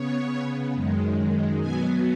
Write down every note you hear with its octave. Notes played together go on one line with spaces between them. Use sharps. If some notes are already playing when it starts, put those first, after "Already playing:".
Already playing: C#3 B3 C#5
F#2 D#3 G#3
B2 F#3 B3 G#5